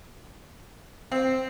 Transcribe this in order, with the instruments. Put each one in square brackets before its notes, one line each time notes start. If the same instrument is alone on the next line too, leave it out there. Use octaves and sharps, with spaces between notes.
[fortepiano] C4